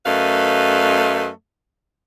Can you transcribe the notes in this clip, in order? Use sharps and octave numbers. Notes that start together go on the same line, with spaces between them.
F#2 A3 B4 D#5 F5